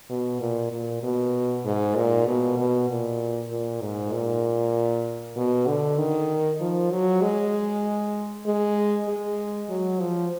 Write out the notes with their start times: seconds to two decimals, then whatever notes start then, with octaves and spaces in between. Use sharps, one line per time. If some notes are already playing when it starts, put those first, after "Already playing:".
0.10 B2
0.41 A#2
0.72 A#2
1.03 B2
1.65 G#2
1.95 A#2
2.26 B2
2.57 B2
2.89 A#2
3.50 A#2
3.82 G#2
4.12 A#2
5.36 B2
5.67 D3
5.98 D#3
6.60 F3
6.91 F#3
7.22 G#3
8.46 G#3
9.08 G#3
9.69 F#3
10.00 F3